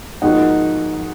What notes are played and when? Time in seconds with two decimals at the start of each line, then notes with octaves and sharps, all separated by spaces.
0.22 G#2 F3 A#3 D#4 F#4